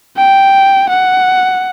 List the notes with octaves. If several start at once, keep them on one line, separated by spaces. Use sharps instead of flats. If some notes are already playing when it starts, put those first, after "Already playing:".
G5
F#5